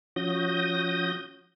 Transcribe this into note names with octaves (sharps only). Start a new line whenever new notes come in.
F3 C#4 F#4 D#6 G6 A#6